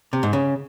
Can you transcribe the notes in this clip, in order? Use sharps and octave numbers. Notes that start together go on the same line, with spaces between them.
C3
G#2
C#3